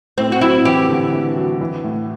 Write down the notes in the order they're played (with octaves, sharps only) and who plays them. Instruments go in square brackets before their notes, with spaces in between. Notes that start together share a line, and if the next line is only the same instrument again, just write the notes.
[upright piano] A2 [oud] C4
[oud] F#4
[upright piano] F#3 [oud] E4
[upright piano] E3 [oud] G4
[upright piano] D3
E3
F#3
E3
A2